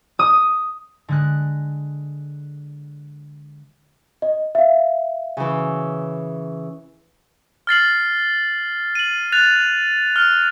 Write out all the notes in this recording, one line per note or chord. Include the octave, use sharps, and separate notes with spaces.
D#6
D3 G#3 F#6
D#5
E5 F5
C#3 E3
F6 A6 C7 F#7
D#7 F#7
F#6 A6 F7
F6